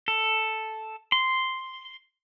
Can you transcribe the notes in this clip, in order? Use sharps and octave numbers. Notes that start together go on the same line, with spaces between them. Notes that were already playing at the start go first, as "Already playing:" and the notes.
A4
C6